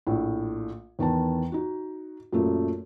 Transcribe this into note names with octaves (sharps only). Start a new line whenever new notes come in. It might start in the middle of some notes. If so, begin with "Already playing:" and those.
A#1 A2
E2 D#3 B3 A5
D#4 F#4
F#2 A#2 A3